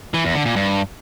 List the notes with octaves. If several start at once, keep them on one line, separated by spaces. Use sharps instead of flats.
E3
E2
D3
A#2
G2